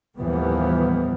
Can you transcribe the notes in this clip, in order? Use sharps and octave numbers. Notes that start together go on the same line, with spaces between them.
D#2 A2 E3 F3 G3 B3